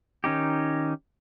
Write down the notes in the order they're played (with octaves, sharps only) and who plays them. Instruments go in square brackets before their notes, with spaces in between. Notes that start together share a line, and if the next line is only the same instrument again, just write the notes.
[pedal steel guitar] D#3 C#4 D#4 G4